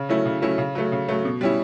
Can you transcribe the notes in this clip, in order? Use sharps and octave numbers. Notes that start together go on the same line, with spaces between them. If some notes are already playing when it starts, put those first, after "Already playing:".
Already playing: C#3
F#3 A3 C#4 E4
C#3
F#3 A3 C#4 E4
C#3
F#3 A3
C#3
F#3 A3
B2
G3 C#4 E4